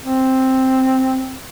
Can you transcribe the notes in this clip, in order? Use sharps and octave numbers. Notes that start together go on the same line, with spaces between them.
C4